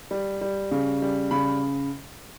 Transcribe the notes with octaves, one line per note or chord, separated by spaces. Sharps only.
G3
G3
C#3
G3
C#3 B5